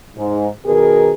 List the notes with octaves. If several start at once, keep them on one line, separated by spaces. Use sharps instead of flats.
G#2
B2 D#3 G#4 A#4